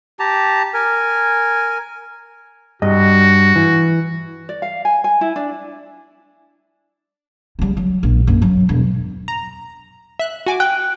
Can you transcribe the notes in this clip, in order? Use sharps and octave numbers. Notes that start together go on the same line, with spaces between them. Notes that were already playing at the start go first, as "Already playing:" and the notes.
G4 A5 A#5
A#4 G#5
G2 F#4 D#5
E3
D5
F5
G#5
G#5
E4
D4
C#3 G3
F#3
A#1
F#2 A#3
F#3
E1 G2
A#5
E5 F#6
F#4 G#5 D6
G5 F#6